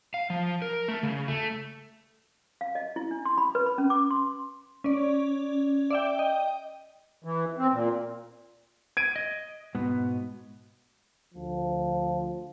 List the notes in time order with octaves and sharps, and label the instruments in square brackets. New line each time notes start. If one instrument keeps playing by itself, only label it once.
[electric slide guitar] F5
F3
A#4
A3
C#3
A3
[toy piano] F5
D#5
E4
D4
C6
B5
B4
B5
C#4
D6
C6
[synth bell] C#4 D5
D5 E5 G5
D#5 G5
[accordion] E3
C4
A#2
[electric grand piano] G#6 D7 D#7
[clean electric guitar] D#5
G#2 B2 B3
[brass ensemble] D2 F3